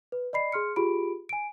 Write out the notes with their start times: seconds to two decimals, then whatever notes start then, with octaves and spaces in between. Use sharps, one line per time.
0.12 B4
0.33 D5 D#5 B5 C7
0.52 G#4 C6 F6 C#7
0.76 F4 G4 G#4 B5 D7
1.29 G#5 D7